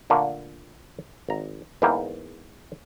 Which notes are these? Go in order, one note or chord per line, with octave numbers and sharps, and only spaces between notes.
A#2 D3 A3 A#3
G#1 A#5
E2 G#2 A#3 E4 A#4 G5